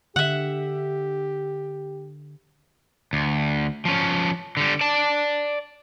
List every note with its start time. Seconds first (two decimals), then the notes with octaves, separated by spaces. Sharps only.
0.16 D3 G4 E5 F#5
3.13 D2
3.85 F3 C#4
4.57 D3 G3
4.81 D5 A5